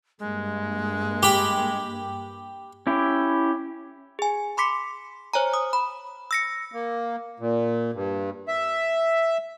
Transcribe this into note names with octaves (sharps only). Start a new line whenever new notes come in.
G2 G#3 A#3
G4 B5
C#4 E4 G4
G#4 G#5
B5 C6 D6 B6 C#7
C5 C#5 G#5 A#5
D#6
B5
E6 A#6 C#7
A#3
A#2
G2
E5